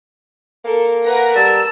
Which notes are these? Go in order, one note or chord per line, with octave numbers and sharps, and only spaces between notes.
A#3 A4 A#4
A#4 B4 F#5 A#6
G3 A5 E6